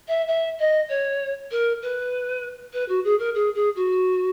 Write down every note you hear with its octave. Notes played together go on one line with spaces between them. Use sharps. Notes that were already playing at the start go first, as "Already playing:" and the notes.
E5
E5
D#5
C#5
A#4
B4
B4
F#4
G#4
A#4
G#4
G#4
F#4